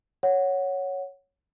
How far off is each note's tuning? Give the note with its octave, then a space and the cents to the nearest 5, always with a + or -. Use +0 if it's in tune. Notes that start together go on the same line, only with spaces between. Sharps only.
C#5 +0 F#5 +0